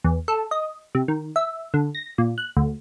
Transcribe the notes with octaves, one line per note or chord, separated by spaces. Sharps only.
E2
A4
D#5
C3
D#3
E5
D3
A#6
A#2
F#6
D2